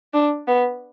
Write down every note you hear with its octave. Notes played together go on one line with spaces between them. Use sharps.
D4
B3